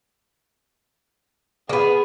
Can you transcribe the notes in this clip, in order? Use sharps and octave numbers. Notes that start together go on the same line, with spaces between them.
A#3 B3 G#4